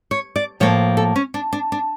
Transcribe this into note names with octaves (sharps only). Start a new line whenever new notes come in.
C#5
D5
A2 F3 A#3 C#5
A4
C#4
D4
D4
D4